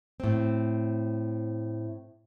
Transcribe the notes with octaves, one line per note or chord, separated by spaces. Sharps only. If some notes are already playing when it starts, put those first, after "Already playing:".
A2 C4